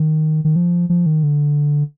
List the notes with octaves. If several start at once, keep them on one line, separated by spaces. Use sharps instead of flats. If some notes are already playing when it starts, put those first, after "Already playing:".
Already playing: D#3
D#3
F3
F3
D#3
D3